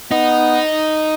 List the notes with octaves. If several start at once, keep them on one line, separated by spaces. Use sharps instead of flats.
B3 D#4